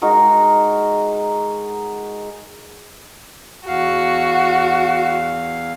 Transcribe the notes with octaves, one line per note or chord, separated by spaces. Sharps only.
G#3 D#4 F#4 A#4
E2 F#4 F5